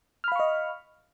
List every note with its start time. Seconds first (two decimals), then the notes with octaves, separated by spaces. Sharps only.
0.24 F6
0.28 B5
0.32 F5
0.36 C#6
0.40 D#5